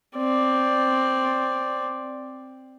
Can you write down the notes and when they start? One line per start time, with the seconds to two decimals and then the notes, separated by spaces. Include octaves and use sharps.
0.16 C4 D5